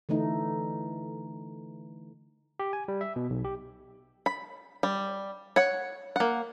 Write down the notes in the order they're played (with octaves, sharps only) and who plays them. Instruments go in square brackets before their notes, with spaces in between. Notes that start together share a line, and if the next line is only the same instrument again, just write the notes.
[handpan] D3 E3 A3 D#4
[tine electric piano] G4
G#5
G3
E5
B2
B1
G4
[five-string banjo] B5
G3
C#5 F#5
A#3 F#5